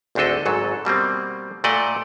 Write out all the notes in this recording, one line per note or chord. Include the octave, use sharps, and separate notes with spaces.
G#1 D2 C4 D4 A4 D#5
G#1 G#2 F#3 A4
B2 G3 A#3 C4
A#2 A3 D5 D#5 F#5